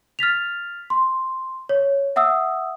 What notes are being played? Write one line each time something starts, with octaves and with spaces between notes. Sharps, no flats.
F6 A6 B6 F7
C6
C#5
E5 F#5 D#6 E6